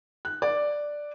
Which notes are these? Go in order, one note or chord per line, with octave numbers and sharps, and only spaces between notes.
F#6
D5